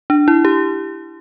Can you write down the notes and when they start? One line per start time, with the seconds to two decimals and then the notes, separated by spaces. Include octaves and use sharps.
0.10 D4
0.28 E4
0.45 G4